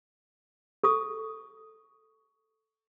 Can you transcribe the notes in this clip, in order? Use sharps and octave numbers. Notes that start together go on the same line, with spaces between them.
A4 C#6 D#6